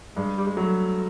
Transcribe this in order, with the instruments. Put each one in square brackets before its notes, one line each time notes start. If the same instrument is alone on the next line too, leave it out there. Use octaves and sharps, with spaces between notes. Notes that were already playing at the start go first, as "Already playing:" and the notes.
[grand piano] G2 [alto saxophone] G#3
[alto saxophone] G3
G#3
[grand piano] F#3 [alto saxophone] A3